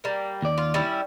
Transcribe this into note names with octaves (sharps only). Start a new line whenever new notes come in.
G3 A#3
D#2 D5
F4
G3 C#4 E4